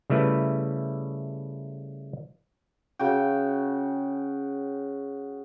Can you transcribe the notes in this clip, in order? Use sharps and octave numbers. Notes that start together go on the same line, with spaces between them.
C#3 G3 A3 E4 B4
C#3 F#4 G5